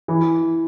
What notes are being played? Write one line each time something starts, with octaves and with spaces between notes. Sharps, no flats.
E3